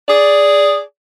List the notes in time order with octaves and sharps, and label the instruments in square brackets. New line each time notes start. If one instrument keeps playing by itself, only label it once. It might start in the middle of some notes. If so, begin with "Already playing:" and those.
[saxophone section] G#4 D5